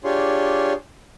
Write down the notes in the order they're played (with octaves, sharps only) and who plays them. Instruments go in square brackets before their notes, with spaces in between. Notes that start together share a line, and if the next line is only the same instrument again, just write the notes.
[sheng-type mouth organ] D4 F4 G4 G#4 C#5 C6